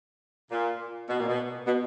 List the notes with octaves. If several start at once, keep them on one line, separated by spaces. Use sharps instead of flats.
A#2
B2
A#2
B2
B2